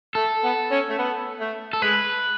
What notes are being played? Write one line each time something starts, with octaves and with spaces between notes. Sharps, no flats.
A3 A4
B3
C#4
A3
B3
A3
A4
G#3 B4